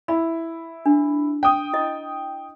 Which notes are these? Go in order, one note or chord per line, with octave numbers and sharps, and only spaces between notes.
E4 B5
D4
G5 D#6
E4 D#5